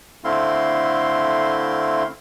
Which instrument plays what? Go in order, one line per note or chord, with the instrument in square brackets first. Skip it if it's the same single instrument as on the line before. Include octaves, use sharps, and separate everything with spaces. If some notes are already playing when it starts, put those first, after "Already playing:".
[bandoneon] D3 A3 C4 E4 F5 C6